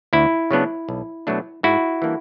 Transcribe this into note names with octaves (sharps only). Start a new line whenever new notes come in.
D2 E4
C#3 F#3 B3 D4
B1
B2 F#3 A3 D4
G#2 E4 F#4
E3 G3 A#3 D4